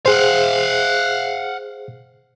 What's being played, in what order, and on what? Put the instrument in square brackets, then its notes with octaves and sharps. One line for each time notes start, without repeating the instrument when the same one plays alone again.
[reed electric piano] G#4 C5 [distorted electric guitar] F5 F#5